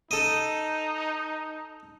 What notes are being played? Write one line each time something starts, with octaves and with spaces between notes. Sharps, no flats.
D#4 A4 D#5